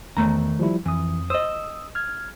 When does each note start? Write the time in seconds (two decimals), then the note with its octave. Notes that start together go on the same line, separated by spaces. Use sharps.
0.17 E2 D#3 A3 A#5
0.59 F3 G3 E4
0.86 F2 E3 D#6
1.30 C5 D#5 D#6 E6
1.95 F6 G#6